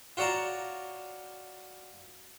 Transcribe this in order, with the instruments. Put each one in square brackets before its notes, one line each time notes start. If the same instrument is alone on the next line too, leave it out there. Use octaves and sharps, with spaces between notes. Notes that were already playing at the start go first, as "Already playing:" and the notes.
[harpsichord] F4 F#4 C#5 D5 A5 A#5